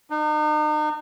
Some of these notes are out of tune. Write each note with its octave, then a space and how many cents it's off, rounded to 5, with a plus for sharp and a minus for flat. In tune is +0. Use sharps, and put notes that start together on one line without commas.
D#4 -40